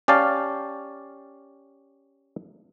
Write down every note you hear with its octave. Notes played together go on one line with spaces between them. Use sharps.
C#4 G4 D5 F5 A5